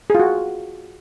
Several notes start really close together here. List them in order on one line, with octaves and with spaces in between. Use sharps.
G#4 F4 F#4